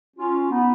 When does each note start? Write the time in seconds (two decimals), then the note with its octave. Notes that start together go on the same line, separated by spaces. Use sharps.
0.17 C#4 F4
0.50 B3 D#4